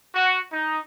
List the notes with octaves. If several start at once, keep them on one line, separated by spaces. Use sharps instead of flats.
F#4
D#4